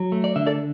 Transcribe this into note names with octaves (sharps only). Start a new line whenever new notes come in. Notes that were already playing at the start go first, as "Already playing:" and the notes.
Already playing: F#3
A3
D5
D3 E5
A4 D5